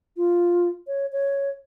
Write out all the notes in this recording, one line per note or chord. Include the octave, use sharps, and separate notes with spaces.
F4
C#5
C#5